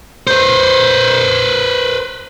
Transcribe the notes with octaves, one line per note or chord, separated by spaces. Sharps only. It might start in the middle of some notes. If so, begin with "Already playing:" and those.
B4 C5